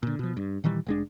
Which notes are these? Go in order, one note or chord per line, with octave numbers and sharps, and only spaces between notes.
A#2 D3
B2 F3
G2
A#2 D#3 E3 G3
F1 G#3 D4